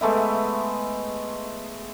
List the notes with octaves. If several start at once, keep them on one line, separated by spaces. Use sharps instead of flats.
G#3 A3 B3 E5